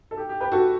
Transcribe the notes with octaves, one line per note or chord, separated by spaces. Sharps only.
A4
G4
G4
G4 B4
F#4 A4